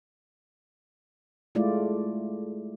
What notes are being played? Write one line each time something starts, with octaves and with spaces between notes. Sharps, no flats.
G#3 A3 E4 F4 D5